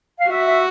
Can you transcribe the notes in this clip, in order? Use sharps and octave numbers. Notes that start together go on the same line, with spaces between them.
F5
F#4 E5
E5